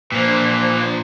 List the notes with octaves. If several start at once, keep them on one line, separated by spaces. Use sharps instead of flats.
A#2 E3 F3 A#3 D4 C5